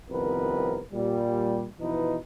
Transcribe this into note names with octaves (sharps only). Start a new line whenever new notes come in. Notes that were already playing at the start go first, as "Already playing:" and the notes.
C2 F2 D#3 B3 A#4 B4
A#2 G3
B2 E3 F3 D#4 E4 B4